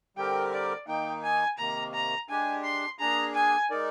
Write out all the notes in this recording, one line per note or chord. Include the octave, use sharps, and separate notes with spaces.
D3 G3 C4 G4 A#4 G5
D5
D#3 A#3 D#4 G5
G#5
C3 D#3 A#3 A#5
A#5
G#3 D4 G4 G#5
C6
A#3 D4 G#4 A#5
G#5
G#3 D#4 A#4 D5